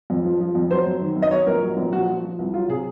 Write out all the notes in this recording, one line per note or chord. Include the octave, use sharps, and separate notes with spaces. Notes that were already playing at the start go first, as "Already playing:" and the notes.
F2
F3
F3
F2
F#3 C5
F#2
D#3
F#2
D#5
F#3 C#5
A#1 A#4
F#3
A#1
F3 F#4
F3
F3
C2
F#3 F4
C3 G#4